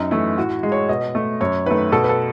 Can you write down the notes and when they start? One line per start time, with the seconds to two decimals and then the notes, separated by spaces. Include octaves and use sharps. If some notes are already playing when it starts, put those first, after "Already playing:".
Already playing: F#2 D#4
0.11 E3 A3 E4
0.38 A2 F#4
0.63 G#3
0.72 C#5
0.89 B2 D#5
1.15 A3
1.41 F#2 C#5
1.66 D#3 A3 B4
1.92 B2 A4
2.04 B4
2.09 A4